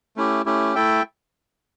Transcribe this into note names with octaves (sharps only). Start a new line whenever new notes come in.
A3 C#4 E4 G4
A3 C#4 E4 G4
A3 E4 A4 E5 G5